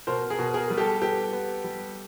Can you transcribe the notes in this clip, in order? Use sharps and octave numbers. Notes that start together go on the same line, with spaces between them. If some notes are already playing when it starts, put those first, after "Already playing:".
B2 A#4 C5
G#4 A#4
B2
G#4 A#4
G3
G4 A4
B3 G4 A4
B3
G3